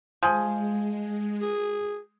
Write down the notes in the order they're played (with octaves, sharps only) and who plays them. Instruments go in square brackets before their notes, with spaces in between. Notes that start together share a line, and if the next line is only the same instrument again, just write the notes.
[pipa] F3 [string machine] G#3 [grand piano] G#5 D#6 G6
[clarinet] G#4